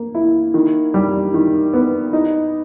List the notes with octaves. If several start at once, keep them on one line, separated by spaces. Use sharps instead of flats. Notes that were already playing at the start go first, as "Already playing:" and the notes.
Already playing: A#3
E4
D#3
G3
D#3
B3
D#4